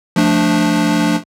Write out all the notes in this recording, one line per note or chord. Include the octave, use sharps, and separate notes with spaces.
F3 A3 D4